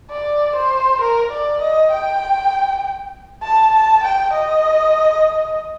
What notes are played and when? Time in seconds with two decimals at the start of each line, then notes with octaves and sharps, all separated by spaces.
0.11 D5
0.56 C5
1.02 A#4
1.32 D5
1.62 D#5
1.92 G5
3.43 A5
3.73 A5
4.03 G5
4.33 D#5